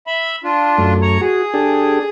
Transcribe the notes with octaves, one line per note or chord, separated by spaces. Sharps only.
E5 B5
D4 F4
F#2 A3
C#5 A#5
F#4 G#4
D4 G4 A4